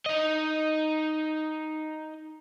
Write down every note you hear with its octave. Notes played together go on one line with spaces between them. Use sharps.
D#4 D#5